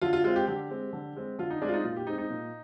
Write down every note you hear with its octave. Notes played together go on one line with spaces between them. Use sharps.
D3 F4
F4
G#3 C4 F4
G4
D3 G4
G#3 C4
D3
G#3 C4
D3 F4
D#4
G#3 C4 D4
F4
D#4
A#2 F4
G4
G#3 C4 D#4
D#4
A#2